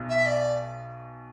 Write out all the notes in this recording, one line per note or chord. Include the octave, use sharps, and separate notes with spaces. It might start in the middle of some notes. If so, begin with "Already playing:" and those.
Already playing: B1 B2
E5
D5